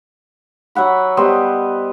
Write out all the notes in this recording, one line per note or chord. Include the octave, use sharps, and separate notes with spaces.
F#3 E5 F#5 B5
G3 B3 C5 D#5